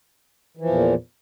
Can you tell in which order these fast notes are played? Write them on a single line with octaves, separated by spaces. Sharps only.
E3 F3 E2 A#2